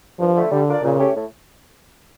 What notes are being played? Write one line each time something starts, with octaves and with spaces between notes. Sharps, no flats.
G2 F3
D3 A3
D3 G3
D4 F4 A#4 D5
A#2 C#3
A3 C#4 G4
A2